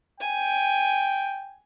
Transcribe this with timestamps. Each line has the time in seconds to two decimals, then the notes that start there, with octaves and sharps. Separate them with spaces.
0.20 G5 G#5